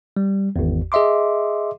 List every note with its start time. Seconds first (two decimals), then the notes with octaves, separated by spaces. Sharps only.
0.17 G3
0.56 G#1 E2
0.92 G#4 D#5 E5 C6 D6